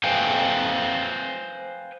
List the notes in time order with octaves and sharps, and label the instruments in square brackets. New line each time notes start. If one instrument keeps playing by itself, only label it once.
[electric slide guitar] B4 C5 F5 G5 G#5